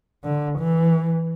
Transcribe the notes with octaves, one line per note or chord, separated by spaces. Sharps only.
D3
E3